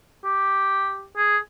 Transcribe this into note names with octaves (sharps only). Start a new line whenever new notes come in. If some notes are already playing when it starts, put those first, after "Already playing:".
G4
G#4